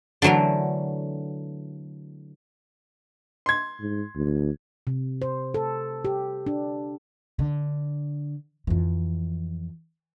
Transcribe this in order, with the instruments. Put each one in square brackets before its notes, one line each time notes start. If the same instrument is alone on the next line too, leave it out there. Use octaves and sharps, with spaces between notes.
[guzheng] D3 E3 F#3 A3 A#4
[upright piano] C6 G#6
[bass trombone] G#2
D2
[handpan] C3
C5
A4
G4
D4
[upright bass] D3
F2 E3